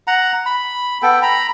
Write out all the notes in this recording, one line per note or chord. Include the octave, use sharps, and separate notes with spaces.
F#5 A#5
B5
B3 A4 G5
A#5 B5